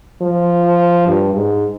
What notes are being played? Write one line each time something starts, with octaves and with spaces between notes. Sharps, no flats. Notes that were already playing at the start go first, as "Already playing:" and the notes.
F3
G2
G#2